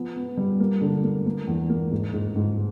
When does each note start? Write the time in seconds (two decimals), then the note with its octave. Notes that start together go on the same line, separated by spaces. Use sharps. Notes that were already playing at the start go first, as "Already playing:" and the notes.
Already playing: F3 B3
0.16 B3
0.37 G3
0.60 A#3
0.81 D3
1.03 A#3
1.26 A#3
1.47 E2
1.70 A#3
1.91 G#2
2.13 G#2
2.36 G#2